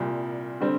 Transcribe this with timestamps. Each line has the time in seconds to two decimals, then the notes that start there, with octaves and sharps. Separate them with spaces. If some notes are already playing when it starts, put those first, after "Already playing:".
Already playing: C2 A#2 G3
0.60 D3 G3 C4